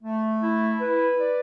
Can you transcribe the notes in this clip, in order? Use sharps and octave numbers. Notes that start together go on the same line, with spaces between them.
A3
E4
B4
D5